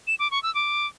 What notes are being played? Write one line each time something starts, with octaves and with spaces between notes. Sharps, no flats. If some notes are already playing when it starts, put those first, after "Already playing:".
E7
D6
C#6
E6
D6